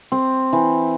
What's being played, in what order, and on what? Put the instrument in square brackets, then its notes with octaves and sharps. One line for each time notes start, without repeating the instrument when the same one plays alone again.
[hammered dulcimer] C4
E3